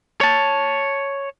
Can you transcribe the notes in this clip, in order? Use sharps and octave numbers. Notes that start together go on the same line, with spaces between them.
C#5 A5